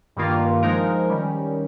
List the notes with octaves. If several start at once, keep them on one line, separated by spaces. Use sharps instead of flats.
G2 D#3 A#3 F4
F3 G#3 D#4 A#4
D#3 G3 C#4